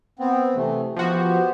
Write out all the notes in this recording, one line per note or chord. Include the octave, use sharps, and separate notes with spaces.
B3 C4
C3 E3 A3
F3 B3 F#4 G4 C5